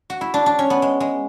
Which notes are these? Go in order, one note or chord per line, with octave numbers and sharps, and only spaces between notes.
F#4
E4
D4
D4
C#4
B3
G#3
G#3